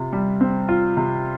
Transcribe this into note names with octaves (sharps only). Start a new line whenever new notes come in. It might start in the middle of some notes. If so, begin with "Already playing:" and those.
Already playing: C3 F4
G3
C4
F4
C3